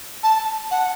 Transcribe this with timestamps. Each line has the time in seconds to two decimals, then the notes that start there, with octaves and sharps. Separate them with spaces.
0.23 A5
0.71 F#5